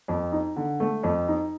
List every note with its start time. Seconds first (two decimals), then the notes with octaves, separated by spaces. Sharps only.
0.08 F2
0.32 D#4
0.56 D3
0.80 A3
1.03 F2
1.28 D#4